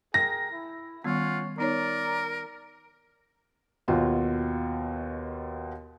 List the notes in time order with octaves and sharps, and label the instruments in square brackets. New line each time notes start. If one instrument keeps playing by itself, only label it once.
[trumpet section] G#4 A#4 G5 [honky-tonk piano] A#6
[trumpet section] E4
[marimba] D#3 G3 B3 [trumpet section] C#4 C#5 F#5 [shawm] F4
[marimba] B3 D#4 C#5 [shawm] A#4 [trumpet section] D5 A#5
[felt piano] D#2 B2 F4 F#4